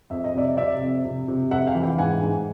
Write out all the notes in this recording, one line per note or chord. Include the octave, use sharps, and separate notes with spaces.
F2 E5
D#5
C3 D5 E5
C3 D5 E5
F2
C3
C3
F2 E5 F#5
F5 G5
E3
F5 G5
G#2 F#5 G#5
G#2